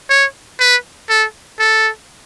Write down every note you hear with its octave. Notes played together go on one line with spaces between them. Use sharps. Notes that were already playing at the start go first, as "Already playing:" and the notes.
C#5
B4
A4
A4